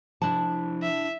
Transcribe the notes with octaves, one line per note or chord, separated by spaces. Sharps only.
C3 F3 D4 E4 A5
E5